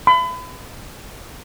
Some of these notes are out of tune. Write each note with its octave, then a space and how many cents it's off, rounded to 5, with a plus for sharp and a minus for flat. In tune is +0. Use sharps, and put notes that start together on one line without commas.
B5 +35